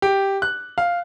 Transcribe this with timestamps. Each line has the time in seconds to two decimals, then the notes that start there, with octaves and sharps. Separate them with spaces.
0.02 G4
0.42 F#6
0.78 F5